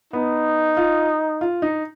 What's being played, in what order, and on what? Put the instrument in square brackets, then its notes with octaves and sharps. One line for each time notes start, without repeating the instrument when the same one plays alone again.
[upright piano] B3 [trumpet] D#4
[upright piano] F4
F4
D#4